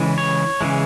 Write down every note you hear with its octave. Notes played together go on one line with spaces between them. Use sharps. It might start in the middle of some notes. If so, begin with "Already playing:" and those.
Already playing: C#3 E3 G#3
C#5
C#3 E3 G#3